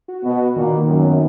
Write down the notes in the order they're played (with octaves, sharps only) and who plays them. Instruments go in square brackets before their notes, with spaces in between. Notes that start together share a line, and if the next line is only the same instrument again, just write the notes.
[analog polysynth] F#4
[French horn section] B2 B3
[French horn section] A#2 A#3 [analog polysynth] D#3
[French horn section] F#2 F#3
[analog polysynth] B3